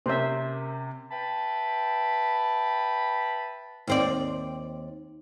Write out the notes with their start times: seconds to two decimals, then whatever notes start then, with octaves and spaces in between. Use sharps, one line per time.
0.06 C3 A#3 C#4 C5 E5
1.11 B4 E5 G5 A5 B5
3.87 D#2 C4 D5